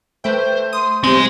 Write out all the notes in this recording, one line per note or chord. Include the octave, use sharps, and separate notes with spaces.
A3 B4 C5 E5 G5
C6 D#6
B1 G#3 C4 G4 C5